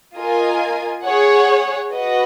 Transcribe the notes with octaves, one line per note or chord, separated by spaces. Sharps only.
F4 A#4 D#5 G#5
G#4 C#5 F#5
F#4 B4 D#5 F#5